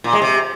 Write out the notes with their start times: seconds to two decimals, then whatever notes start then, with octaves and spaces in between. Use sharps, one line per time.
0.04 A#2
0.13 G#3
0.22 C3